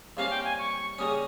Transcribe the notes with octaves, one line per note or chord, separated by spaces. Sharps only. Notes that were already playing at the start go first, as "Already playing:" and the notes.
C2 C3 G3 A#3 C#4 F5
G5
G#5
C#6
C#3 G3 A#3 C#4 D#6